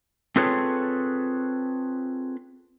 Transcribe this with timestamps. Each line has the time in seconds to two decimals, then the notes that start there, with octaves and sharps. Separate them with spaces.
0.36 C4 F4 G#4 A4 B4 C#5